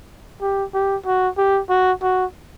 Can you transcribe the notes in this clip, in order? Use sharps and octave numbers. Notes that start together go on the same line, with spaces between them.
G4
G4
F#4
G4
F#4
F#4